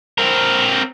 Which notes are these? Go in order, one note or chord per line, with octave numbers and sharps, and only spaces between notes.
C4 A#4